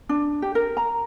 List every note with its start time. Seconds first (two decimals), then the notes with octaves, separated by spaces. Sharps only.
0.09 D4
0.42 G4
0.55 A#4
0.77 A#5